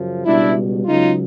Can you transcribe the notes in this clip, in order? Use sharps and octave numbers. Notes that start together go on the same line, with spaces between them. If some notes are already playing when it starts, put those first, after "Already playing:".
Already playing: F#2 C#3 F3
C#2 B2 G3 D4 E4
C#2 C#3 F#3 D#4 F4